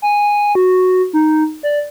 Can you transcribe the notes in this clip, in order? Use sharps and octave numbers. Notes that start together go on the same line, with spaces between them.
G#5
F#4
D#4
D5